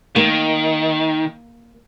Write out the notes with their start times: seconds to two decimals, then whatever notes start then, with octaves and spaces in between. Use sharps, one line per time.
0.16 D#3 A#3